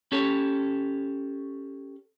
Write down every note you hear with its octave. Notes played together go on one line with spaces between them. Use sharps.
C#4 G4 A4 C#5